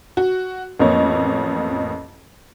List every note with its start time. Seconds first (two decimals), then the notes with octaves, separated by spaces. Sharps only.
0.17 F#4
0.79 A1 F2 A#3 C#5